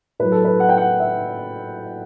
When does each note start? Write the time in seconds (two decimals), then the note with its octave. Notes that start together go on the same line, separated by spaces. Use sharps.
0.19 A2 F#3 B4
0.32 A4
0.45 B4
0.60 F#5
0.69 G5
0.78 F#5
1.00 E5